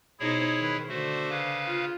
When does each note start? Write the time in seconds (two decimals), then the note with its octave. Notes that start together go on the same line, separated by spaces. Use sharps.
0.20 B2 D#4 E4 G#4 C5 C#5
0.60 D#3 B4
0.89 D3 A3 F#4 C5
1.30 C#3 B4 F5
1.65 F4